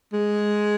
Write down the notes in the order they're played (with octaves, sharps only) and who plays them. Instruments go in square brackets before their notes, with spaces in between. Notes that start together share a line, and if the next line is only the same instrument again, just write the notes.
[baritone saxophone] G#3